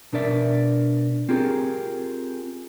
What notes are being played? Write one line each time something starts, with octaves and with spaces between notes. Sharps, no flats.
B2 D4 A#4 D5 E5
C4 F4 G4 G#4 A#4